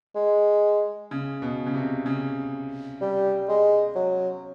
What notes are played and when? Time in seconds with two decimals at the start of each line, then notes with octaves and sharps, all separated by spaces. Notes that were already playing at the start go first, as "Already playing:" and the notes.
0.15 G#3
1.11 C#3
1.42 B2
1.66 C#3
1.74 C3
2.06 C#3
3.01 G3
3.49 G#3
3.95 F#3